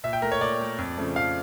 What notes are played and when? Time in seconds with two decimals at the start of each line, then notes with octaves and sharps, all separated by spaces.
0.03 A#2 E5
0.13 G5
0.22 A3 A#4
0.32 C#5
0.41 A#2 D5
0.60 A3
0.78 F2
0.97 C#3 F3 A3
1.16 F2 F5